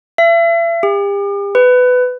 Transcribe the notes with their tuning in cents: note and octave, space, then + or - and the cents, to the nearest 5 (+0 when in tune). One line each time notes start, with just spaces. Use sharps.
E5 +40
G4 +40
B4 +20